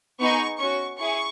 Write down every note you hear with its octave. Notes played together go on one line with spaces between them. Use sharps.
B3 D#4 G#4 C#6
C#4 F#4 C#6
E4 G#4 C#6